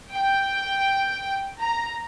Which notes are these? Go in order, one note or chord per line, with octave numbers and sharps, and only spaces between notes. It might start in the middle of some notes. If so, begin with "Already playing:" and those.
G5
A#5